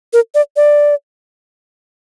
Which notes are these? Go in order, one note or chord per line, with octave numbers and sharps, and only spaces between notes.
A#4
D5
D5